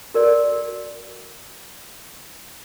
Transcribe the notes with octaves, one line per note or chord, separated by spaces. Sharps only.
F#4 A#4 D5